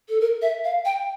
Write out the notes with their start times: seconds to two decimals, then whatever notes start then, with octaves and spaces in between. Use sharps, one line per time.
0.09 A4
0.21 A#4
0.42 E5
0.64 F5
0.85 G5